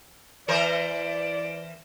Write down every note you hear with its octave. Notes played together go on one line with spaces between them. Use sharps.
E3 A#4 C5 D5